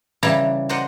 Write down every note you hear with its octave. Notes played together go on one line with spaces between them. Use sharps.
C#3 E3 G3 E4 A5 A#5
A#4 C5 D5 D#5 F#5